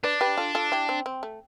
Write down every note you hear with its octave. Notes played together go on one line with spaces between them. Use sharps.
D4 B4 D5
G4 B4
F4 A4
F4 A4
E4 G4
C4
C4
A3